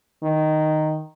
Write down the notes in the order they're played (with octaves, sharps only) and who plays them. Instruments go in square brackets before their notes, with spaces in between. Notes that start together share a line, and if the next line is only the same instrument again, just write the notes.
[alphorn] D#3